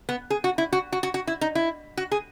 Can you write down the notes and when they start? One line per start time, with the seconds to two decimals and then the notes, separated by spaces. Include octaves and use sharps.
0.09 B3
0.30 G#4
0.44 F#4
0.58 E4
0.73 F#4
0.92 F#4
1.03 F#4
1.14 F#4
1.27 E4
1.41 D#4
1.55 E4
1.97 F#4
2.11 G#4